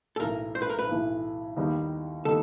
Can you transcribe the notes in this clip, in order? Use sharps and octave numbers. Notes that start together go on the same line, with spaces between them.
A4
B1 A2 E3 A#4
C5
B4
A#4
B4
B1 A2 E3
D#2 D#3 G3 B3 D#4
D#3 G3 B3 D#4 A4